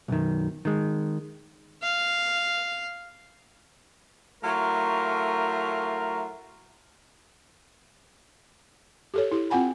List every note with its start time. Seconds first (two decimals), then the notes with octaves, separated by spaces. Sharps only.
0.08 B1 F#2 D#3
0.65 D#3 G#3
1.82 F5
4.44 F#3 A3 E4 F4 A#4
9.14 G4 A4 C#5
9.32 E4 G4
9.50 C4 F4 F#5 G#5 B5